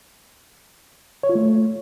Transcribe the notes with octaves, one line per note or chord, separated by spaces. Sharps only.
C#5
F4
A3